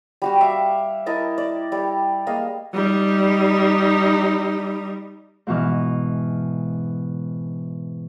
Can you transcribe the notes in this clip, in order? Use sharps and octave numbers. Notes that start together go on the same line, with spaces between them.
G3 F#4 G4
E5 F5 D6
E4 A#4 D#5 A5
D5
G3 G4 A4 D5
G#3 A#3 D#5 F5
G3 D#4
G#2 B2 E3 F6